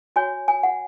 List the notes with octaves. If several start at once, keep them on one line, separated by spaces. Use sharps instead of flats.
F#4 C#5 G#5
G#5
F#5